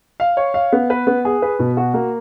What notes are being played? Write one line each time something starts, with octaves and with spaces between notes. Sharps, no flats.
F5
C#5
F5
B3
B4
B3
G#4
B4
B2
F#4
A#3